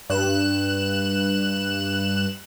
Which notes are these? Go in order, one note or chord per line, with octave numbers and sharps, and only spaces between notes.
G2 F#6 E7